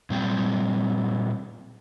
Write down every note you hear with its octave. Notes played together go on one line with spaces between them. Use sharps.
A#2 G3 C4